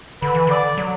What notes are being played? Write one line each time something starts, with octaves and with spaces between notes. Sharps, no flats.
D3 B4
E3
D3 D5
F#3